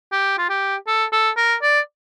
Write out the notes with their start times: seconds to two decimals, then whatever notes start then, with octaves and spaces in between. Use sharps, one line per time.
0.12 G4
0.38 F4
0.50 G4
0.87 A4
1.13 A4
1.37 A#4
1.63 D5